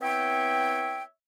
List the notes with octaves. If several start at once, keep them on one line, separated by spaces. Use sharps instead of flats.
B3 C4 E4 C#5 E5 G5